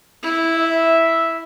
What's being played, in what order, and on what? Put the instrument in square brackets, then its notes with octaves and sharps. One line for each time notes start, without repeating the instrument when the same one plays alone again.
[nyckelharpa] E4
[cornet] E5